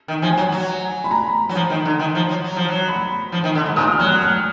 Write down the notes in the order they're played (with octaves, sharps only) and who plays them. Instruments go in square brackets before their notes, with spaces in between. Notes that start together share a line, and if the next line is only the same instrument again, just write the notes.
[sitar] D#3
[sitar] F3 [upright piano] G#5
[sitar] F#3
F#3
[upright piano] B5
A#5
[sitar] F#3
F3
D#3
D3
D#3
F3
F#3
F#3
F3
F#3
[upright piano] B5
[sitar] F3
D#3
D3
G#2
[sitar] A#2 [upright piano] D#6
[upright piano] D#6
F6
[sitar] F#3
[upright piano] F#6
F6